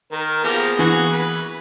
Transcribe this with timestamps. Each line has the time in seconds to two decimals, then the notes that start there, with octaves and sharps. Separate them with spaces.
0.12 D#3 A#4
0.44 F3 A#3 B3 G4 G#4 A#4
0.79 E3 F#4
1.12 B4